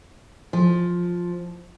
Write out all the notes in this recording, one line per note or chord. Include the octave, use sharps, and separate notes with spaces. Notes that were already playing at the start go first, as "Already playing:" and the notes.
F3